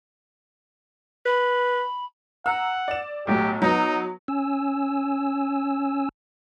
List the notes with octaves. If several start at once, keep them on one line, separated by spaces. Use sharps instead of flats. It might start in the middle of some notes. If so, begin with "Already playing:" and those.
B4 B5
F#5 A#5 E6
D5 E7
B1 A2 F#3 G4
F#3 B3 D#4
C#4 G#5 E6